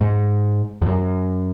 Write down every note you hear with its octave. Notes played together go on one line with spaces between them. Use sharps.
G#2
E2
F#2